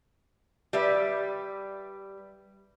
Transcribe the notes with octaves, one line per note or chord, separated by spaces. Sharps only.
G3 B4 E5